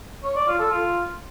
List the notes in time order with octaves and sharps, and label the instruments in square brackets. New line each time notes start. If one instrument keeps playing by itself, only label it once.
[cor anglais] C#5
D5
F4
A4
F4